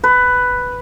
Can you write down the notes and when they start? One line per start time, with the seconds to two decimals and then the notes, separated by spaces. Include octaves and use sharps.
0.04 B4